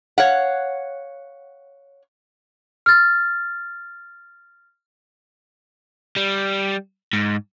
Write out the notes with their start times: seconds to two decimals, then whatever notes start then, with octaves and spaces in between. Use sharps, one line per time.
0.18 C#5 F5 F#5
2.86 F6 A6
6.16 G3
7.13 G#2